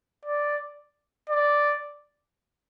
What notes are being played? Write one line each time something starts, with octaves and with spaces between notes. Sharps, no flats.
D5
D5